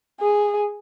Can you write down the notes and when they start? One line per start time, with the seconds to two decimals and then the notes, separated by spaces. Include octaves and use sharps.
0.20 G#4